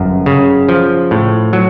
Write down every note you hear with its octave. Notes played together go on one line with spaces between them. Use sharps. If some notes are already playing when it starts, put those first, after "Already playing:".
Already playing: G1 F#2
C#3
F3
A2
F#3